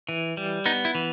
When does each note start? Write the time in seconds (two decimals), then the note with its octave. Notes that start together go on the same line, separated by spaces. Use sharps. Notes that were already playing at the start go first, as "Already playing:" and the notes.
0.09 E3
0.37 G3
0.66 B3 D#4
0.85 E4
0.95 E3